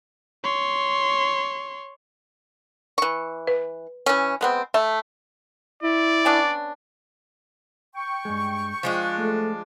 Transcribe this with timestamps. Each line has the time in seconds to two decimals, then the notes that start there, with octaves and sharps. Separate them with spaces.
0.44 C#5 C6
2.98 E3 C#6
3.47 B4
4.06 E3 C#4
4.41 G#3 B3 C4
4.74 A3 E5
5.83 E4 D5
6.25 B3 C#4 D4
7.95 G5 C#6
8.25 G2 G#3
8.83 F3 G#3 D4 F4 C5
9.19 A3